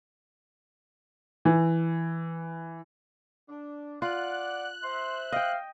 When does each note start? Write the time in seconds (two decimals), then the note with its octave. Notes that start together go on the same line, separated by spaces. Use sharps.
1.45 E3
3.49 D4
4.02 F4 D5 F#5 F#6
4.84 C5 E5 C6
5.32 D#5 F5 G5